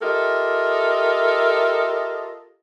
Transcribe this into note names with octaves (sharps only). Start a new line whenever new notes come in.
F4 G4 A4 A#4 D#5 E5